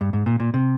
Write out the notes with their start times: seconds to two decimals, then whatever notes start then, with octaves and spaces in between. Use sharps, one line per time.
0.01 G2
0.13 G#2
0.26 A#2
0.40 A#2
0.54 C3